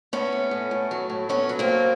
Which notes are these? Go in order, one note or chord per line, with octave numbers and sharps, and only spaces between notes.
A2 B3 C#4
A2
A2
A2
F#3
A2
F#3 B3 C#4
F#3
A#3 C4
A2